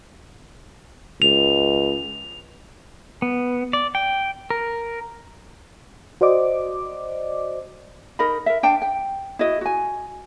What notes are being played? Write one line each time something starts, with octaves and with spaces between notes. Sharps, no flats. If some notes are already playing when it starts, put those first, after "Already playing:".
C#2 F7
B3
D5
G5
A#4
F#4 C5 D5 D#5 D6
D#4 A#4 D#5 B5
A#4 E5
D4 G5 A5
G5
E4 F#4 D#5
F#4 G#5